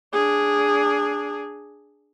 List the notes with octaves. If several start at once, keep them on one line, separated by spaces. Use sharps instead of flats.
D4 G#4